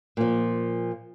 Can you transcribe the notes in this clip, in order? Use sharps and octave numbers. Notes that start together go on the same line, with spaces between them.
A#2 F3